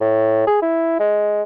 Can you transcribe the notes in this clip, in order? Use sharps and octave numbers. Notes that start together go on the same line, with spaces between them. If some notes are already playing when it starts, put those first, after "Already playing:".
A2
G#4
E4
G#3